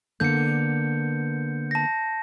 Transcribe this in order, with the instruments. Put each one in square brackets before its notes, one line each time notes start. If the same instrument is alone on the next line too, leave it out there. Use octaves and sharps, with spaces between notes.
[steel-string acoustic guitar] D3 A#3 B3 [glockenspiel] G6 C#7
[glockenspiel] A5 A#6